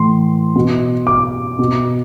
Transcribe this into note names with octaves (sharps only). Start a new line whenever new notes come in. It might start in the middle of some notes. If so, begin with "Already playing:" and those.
Already playing: A2 E3 C6
B2
D6
B2